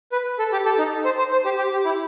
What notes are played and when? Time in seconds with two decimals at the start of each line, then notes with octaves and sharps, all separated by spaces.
0.12 B4
0.39 A4
0.52 G4
0.65 A4
0.78 D#4
1.05 C5
1.18 C5
1.32 C5
1.45 G4
1.58 G4
1.72 G4
1.85 E4